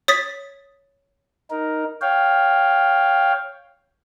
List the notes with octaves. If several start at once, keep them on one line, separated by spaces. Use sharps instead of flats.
C#5 D#6 A6 B6
D#4 A#4
C#5 F5 G5